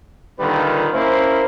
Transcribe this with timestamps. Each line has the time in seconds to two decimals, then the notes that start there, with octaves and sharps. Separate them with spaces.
0.39 A#2 D3 D#3 G3 F4 B4
0.93 A#3 C#4 E4 C5